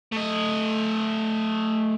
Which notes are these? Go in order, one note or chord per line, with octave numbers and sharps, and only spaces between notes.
A3 D#5